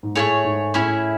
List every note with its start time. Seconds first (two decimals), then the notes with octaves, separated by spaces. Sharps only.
0.03 G#2
0.15 A2 A3 E4 G#4 C#5
0.45 G#2
0.74 A2 C#4 E4 G#4